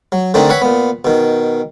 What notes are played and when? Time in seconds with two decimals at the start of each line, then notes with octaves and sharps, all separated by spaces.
0.12 F#3
0.34 D3 D#3 A3 C4 D4 D#4
0.50 B4 C#5 E5 F#5 B5
0.62 A#2 B3
1.05 B2 D#3